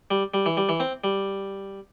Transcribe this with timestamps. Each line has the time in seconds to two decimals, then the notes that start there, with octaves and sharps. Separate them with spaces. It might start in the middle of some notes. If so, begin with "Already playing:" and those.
0.11 G3
0.34 G3
0.46 E3
0.57 G3
0.69 E3
0.80 C4
1.04 G3